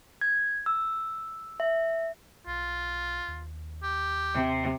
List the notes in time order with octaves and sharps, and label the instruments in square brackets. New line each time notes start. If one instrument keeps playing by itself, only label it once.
[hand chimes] G#6
E6
E5
[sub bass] B1 [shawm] F4
[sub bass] D#2
[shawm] G4
[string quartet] C3